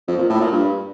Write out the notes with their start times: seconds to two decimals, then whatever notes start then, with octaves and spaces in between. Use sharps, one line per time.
0.07 F2
0.18 A#2
0.29 A2
0.40 A#2
0.51 G2